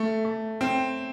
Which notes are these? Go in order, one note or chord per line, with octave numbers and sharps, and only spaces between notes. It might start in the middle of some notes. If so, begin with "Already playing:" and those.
Already playing: A3
A3
C4